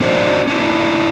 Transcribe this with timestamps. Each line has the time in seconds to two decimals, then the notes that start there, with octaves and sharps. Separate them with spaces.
0.01 C#4 D4 F#4 C5 D5 D#5
0.47 C#4 D4 E4